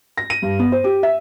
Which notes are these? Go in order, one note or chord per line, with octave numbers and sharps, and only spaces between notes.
A#6
D#7
G2
B3
C5
G4
E5